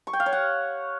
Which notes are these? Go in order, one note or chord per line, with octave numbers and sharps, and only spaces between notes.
C#6
G5
F5
C#5
F#5